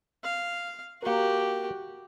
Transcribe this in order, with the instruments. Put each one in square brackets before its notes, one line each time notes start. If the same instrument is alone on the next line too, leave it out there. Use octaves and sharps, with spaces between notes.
[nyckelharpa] F5
[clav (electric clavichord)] A#3 A#4 [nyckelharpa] F#4 G4